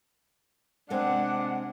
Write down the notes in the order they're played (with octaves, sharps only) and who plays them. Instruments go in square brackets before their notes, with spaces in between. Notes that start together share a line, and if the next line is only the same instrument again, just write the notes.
[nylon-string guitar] C3 G#3 C4 [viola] D4 [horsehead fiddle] F#5